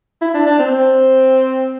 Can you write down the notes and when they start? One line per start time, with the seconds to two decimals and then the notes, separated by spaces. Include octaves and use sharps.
0.22 E4
0.34 D4
0.46 D4
0.59 C4